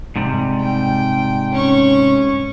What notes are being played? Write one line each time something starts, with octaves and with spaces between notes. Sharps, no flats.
G#2 C3 G3
G5
C#4 C#6